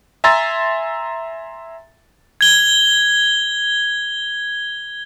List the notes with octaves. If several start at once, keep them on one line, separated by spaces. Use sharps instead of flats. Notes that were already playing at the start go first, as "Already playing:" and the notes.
E5 G#5 A#5 C6 E6 A6
G#6 G7